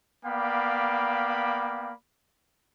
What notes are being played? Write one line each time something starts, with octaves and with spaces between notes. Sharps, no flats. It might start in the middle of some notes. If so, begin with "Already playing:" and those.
A#3 B3 D5 F5 G5 B5